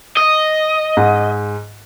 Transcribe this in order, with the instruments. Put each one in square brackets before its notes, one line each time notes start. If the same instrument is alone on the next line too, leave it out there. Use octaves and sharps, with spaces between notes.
[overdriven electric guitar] D#5
[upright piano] G#2